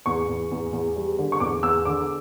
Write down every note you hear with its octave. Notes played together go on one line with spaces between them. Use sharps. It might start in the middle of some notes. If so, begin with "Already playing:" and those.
E2 C#6
E2
E2
E2
G3
D3
C#6
E2 D6
E2 E6
D3 D6